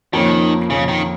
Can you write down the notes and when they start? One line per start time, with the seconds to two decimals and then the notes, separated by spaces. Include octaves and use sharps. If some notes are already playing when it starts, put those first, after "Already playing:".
0.13 F2 D#3 F3 A#3 C#4
0.70 F2 C#3 F3 A#3 C#4
0.88 D#3